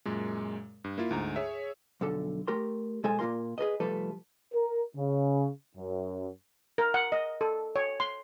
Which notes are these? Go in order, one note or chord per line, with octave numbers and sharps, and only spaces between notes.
F#2 A#2 G#3
G2
A#3 E4 F4
D2 G#2 A#5
G#4 C#5 E5
B1 F2 D3 A4
A3 G4 A#4 C6
B2 G#3 A4 C5 G#5
A#2 A#3 F4 A#4 C6
G#4 A#4 B4 D#5
C3 F3 G3 A3 A4 B4
A#4
C#3
F#2
A#4
F#5
D#5
A4
C#5
C6